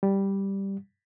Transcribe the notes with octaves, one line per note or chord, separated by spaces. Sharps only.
G3